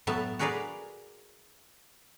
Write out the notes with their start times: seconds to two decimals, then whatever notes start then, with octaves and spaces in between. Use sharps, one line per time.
0.07 A2 F#3 B3 E5 A5
0.39 F#4 G#4 A#4 B4 D5 F5